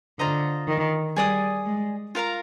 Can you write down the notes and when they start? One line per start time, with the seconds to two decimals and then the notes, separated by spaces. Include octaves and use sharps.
0.19 D3 F4 C5 D#5 A#5
0.68 D#3
1.16 G3 G#4 D5 G#5 D#6
1.66 G#3
2.15 F4 A#4 F5 A#5